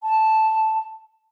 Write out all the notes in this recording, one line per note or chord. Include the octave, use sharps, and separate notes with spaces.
A5